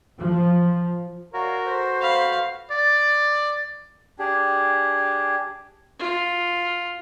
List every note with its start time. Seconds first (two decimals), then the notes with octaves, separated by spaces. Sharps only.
0.20 F3
1.33 F#4 A#4 C#5 D5 F5
1.65 A4 B4 C5
2.02 F5 B5
2.71 D5
4.19 D4 G4 G#4
5.99 F4